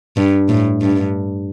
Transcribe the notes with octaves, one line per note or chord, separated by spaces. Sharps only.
G2
A2
G2